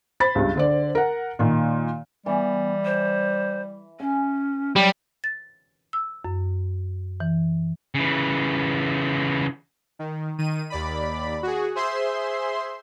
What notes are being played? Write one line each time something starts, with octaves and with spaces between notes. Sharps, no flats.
C5 B5 A6
C#2 G2
D3 C5 D5
A#4 F#5
A#2 D#3
E3 G3 B3
C5
C#4 G#5
F#3 G3
A6
E6
F#2
E3
C#3 E3
D#3
D#3 D#7
D#2 D5 B5
F#4 G#4
G#4 C5 E5 C6